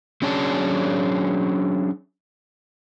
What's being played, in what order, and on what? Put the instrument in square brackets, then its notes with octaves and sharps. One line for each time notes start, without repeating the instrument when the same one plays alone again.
[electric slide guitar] F#3 C#4 D4 G#4 C#5 A5